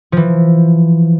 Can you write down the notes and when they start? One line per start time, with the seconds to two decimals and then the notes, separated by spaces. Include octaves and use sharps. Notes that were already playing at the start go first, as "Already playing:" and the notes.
0.12 E3 F3